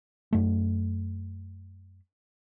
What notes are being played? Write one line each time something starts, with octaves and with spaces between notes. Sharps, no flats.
F#2 A3